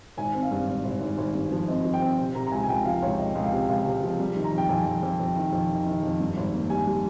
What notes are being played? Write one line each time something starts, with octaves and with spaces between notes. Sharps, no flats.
G#1 G#5
C4
F5
G2
G#1
G#1
G#1
G#1
G2
F3
C4 D#5
F3
G5
C4
C3
C3 A#5
A#5
C#2 G#5
G#5
C#2 G5
F3 F5
C#2 C#5
C#2 D#5
C#2
F5
C3
C#2 F5
C3
F5
F3
G3
D#3
A#5
F2
G5
F2 G#5
F2
F2
F2
D#3
F2
D#3
D#3
F2
G2
G#1
A#3
G3 G#5
G3